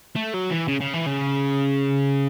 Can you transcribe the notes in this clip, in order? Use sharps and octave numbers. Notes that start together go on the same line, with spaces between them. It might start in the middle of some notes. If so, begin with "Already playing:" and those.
A3
F#3
E3
C#3
C#3
E3
C#3